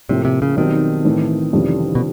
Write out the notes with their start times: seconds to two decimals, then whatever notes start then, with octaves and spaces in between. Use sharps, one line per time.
0.09 A2 C3 F3 A#3
0.25 C3
0.42 C#3
0.57 B1 B2 D#3 G3 C4
1.04 A2 E3 A3 C4
1.53 F1 F2 C#3 E3 G3
1.95 B2